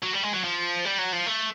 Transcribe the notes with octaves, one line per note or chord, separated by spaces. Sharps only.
F#3
G3
G#3
F#3
F3
G3
F#3
F3
A3